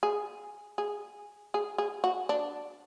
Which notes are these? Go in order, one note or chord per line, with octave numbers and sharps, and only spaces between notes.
G#4
G#4
G#4
G#4
F#4
D4